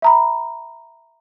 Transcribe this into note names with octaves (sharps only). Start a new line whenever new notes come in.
E5 A#5 B5